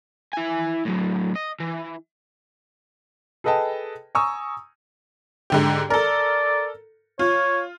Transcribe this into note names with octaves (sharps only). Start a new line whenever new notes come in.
E4 G#5
A2 F#3
D#5
E3
G#4 A4 B4 D#5 G5 A5
G#5 A#5 C#6 D#6 E6
G#2 D3 G4
A4 A#4 D5
F4 C#5